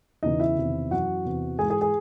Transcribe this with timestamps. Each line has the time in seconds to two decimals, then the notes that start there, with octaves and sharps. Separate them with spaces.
0.23 E2 C#3 E3 D#4 D#5
0.40 E4 E5
0.57 E2 C3 D#3
0.91 F#2 E3 F#4 F#5
1.25 E2 C3 E3
1.59 G#2 E3 G#4 G#5
1.70 G#4 G#5
1.81 G#4 G#5